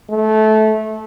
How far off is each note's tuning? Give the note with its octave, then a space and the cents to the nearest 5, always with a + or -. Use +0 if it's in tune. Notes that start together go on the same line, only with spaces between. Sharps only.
A3 -20